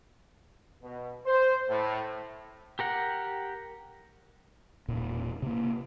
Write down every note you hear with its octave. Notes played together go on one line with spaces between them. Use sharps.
B2
C5
A2
G4 A#4 F#5
E1 A#2
C3 A#3